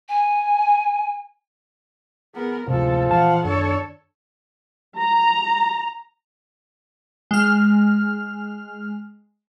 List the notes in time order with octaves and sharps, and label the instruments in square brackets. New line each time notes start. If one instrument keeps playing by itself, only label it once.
[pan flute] G#5
[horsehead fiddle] B3 A#4 [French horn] G#4
[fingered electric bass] D2 A2 C3 [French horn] F3 [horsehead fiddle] G#3 A4
[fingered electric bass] A#2 E3 [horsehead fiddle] F5 F#5 [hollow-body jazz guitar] A5
[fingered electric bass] F#2 D#3 [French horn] D4 [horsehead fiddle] A4 C#5
[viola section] A#5
[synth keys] G#3 F6